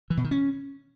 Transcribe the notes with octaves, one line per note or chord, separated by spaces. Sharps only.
E3
B2
D#3
C#4